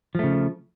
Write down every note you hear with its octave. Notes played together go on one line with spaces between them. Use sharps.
C#3 F3 A3